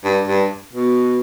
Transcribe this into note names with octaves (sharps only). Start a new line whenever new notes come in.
G2
G2
B2